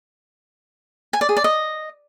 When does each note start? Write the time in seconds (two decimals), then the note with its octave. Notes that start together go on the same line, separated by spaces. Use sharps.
1.13 G#5
1.21 D5
1.29 G#4
1.37 D5
1.44 D#5